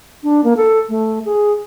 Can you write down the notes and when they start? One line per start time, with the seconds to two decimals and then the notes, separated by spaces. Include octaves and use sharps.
0.23 D4
0.44 A#3
0.57 A4
0.89 A3
1.25 G#4